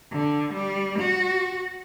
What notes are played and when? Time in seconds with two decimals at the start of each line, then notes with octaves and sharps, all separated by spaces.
0.12 D3
0.53 G3
0.99 F#4